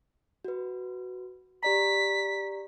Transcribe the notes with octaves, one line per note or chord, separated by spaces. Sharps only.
F#4 B4
G4 D5 A#5 B6